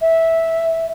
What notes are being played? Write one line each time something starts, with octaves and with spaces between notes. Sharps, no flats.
E5